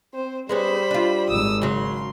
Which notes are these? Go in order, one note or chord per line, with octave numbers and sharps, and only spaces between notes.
C4 C5
G3 G#3 B3 C#4 C5 B5
D4 F4
G#1 D#6 E6
C#3 F#3 C6